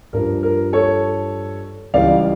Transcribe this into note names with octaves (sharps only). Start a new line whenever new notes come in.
G2 F3 A#4
A#4
A4 C#5
C#2 C#3 E3 G3 D5 F5